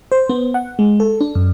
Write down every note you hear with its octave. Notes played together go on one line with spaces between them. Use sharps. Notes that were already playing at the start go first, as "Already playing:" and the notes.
C5
B3
F#5
G#3
A4
D4
F#2